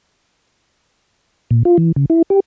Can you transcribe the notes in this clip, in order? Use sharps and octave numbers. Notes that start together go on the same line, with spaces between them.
A#2
F4
E3
C#3
E4
G4